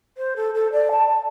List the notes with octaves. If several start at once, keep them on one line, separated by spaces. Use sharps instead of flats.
C5
A4
A4
D5
A5